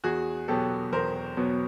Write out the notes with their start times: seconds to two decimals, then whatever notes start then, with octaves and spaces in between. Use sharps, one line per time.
0.04 E2 F#4 G#4
0.48 B2 F#3 B3 G4 A4
0.92 E2 A#4 C5
1.37 B2 F#3 B3